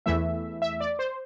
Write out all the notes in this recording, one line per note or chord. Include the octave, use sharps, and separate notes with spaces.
E2 E3 A3 E5
E5
D5
C5